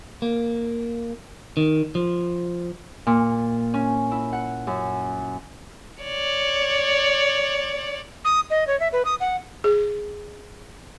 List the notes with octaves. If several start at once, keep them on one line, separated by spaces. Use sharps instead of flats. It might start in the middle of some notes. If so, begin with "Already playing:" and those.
A#3
D#3
F3
A#2
C#4
E4
F#5
F#2
C#5 D5
D#6
D#5
C#5
E5
B4
D#6
F#5
G#4